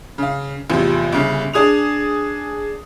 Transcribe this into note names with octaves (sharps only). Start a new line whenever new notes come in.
C#3 F5
A1 E2 C3 F3
G1 C#3
D4 G#4 D#6 F7